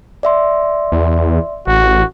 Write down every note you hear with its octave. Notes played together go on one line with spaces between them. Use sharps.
D5 E5 C6
E2
A1 F#4